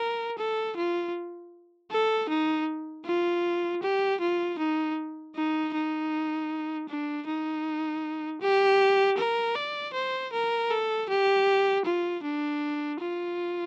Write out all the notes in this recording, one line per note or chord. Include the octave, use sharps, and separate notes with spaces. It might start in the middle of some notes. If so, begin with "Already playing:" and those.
Already playing: A#4
A4
F4
A4
D#4
F4
G4
F4
D#4
D#4
D#4
D4
D#4
G4
A#4
D5
C5
A#4
A4
G4
F4
D4
F4